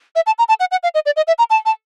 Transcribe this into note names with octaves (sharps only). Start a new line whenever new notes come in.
E5
A5
A#5
A5
F#5
F#5
F5
D#5
D5
D#5
E5
A#5
A5
A5